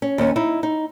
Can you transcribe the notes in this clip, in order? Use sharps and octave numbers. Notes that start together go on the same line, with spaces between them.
C#4
D#2 C#4
D#4 E4
D#4